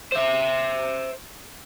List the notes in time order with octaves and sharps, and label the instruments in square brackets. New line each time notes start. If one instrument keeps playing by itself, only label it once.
[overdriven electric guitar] C5 E5